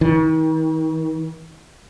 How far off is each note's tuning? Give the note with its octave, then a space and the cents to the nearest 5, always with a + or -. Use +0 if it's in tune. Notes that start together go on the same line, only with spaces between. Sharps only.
D#3 +40